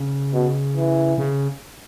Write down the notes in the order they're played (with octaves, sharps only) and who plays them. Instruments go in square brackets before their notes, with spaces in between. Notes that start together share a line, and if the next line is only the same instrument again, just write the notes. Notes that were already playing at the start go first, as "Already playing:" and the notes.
Already playing: [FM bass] C#3
[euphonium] B2
E3
[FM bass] C#3